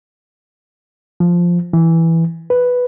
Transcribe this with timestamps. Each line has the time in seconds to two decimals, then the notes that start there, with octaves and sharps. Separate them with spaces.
1.20 F3
1.73 E3
2.50 B4